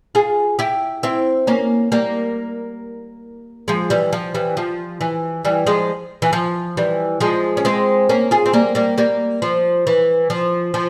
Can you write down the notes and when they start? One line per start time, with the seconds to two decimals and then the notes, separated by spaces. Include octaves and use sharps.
0.15 F4 G#4
0.59 E4 G4
1.03 C4 E4
1.47 A#3 C#4
1.92 G3 A#3
3.68 F3 G#3
3.90 E3 G3
4.13 F3
4.34 E3 G3
4.57 F3
5.01 E3
5.45 E3 G3
5.66 F3 G#3
6.22 E3
6.33 F3
6.77 E3 G3
7.20 F3 G#3
7.57 C#4
7.65 G#3 C4
8.09 A#3 C#4
8.31 F4 G#4
8.46 C4
8.53 G3 A#3
8.75 G3 A#3
8.98 G3 A#3
9.42 F3
9.87 E3
10.30 F3
10.74 F3